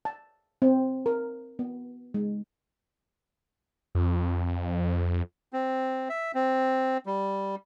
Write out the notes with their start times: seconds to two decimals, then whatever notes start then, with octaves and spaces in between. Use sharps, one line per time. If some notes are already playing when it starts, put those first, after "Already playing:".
0.05 A5
0.62 C4
1.06 A#4
1.59 B3
2.14 G#3
3.95 F2
5.53 C4
6.09 E5
6.35 C4
7.06 G3